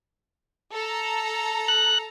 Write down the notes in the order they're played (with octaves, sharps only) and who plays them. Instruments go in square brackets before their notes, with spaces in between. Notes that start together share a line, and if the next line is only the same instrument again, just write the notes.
[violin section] A4 A#5
[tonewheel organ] F#6